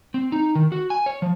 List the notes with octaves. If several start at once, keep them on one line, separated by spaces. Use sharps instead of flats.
C4
D#4
D#3
F#4
G#5
C#5
F3